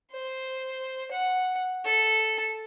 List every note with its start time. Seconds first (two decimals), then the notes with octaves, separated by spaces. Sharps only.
0.12 C5
1.11 F#5
1.85 A4